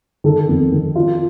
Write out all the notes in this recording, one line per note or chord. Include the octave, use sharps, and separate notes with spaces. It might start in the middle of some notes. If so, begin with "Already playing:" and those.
D#3 A4
F2
D#3
F4